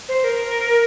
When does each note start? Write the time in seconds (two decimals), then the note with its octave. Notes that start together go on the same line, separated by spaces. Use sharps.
0.09 C5
0.24 A#4